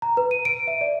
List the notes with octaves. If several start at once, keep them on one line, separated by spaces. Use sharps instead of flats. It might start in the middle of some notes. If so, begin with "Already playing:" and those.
A#5
B4
D#7
D7
E5
D5